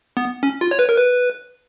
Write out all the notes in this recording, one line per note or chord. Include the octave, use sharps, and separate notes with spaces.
B3
C#4
F4
C#5
B4
A#4
B4